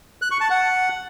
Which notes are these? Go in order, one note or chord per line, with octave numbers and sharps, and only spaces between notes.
F#6
C#6
A5
F#5